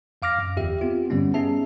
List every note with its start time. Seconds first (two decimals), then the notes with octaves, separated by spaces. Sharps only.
0.22 F2 F5 D6 F6 A#6
0.39 F#2
0.56 G1 E2 G4 E5
0.81 B3 C4 F4 G4
1.10 G2 D3 G3 B3 C#4
1.34 B3 C#4 D#4 G#4 E5 A5